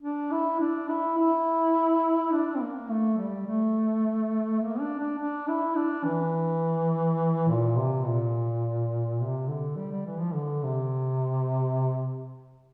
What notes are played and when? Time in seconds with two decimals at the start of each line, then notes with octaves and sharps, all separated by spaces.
0.02 D4
0.31 E4
0.60 D4
0.89 E4
1.18 E4
2.33 D4
2.56 C4
2.61 A#3
2.89 A3
3.18 G3
3.47 A3
4.62 A#3
4.80 D4
5.00 D4
5.19 D4
5.48 E4
5.76 D4
6.05 E3
7.48 A#2
7.76 C3
8.06 A#2
9.21 C3
9.48 D3
9.77 G3
9.91 G3
10.06 E3
10.20 F3
10.35 D3
10.63 C3